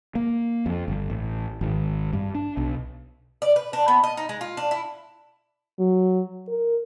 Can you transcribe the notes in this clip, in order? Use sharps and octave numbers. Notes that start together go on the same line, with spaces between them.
A#3
F2
G1
A1
G#1
G2
D4
B1
D5
B4
D4
B3
D#5
D#4
G#3
F4
D4
E4
F#3
A#4